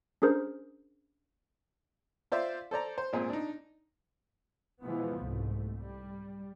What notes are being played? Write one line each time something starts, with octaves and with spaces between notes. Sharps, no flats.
C#4 D4 G#4 A#4 C5
F4 C5 D5 E5 F5
A4 C5 D5 A#5
C5
G#1 A#2 C4 G#4
D4 D#4
B2 E3 F3 G#3 B3
C2 G#2 A3
G3